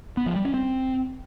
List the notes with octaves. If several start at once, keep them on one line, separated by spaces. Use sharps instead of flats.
B3
F3
G3
C#4
C4